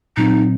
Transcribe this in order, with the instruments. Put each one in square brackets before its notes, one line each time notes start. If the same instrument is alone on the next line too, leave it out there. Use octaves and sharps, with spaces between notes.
[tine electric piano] A#2 F#3 C4 [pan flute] D#4